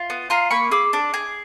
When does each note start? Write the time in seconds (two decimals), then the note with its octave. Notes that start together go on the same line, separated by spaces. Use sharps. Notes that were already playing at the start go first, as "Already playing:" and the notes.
Already playing: F4
0.10 B3
0.30 F4 A#5 C6
0.50 A#3 B5 C#6
0.71 G#4 D6 E6
0.93 D4
1.14 G#4